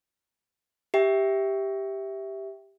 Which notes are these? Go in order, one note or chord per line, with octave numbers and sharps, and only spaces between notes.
G4 E5 G5